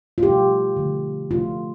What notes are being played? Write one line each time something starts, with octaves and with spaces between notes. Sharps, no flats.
F4
B2 A3 G4
D3 F3 A3
C3 F3 A3 F4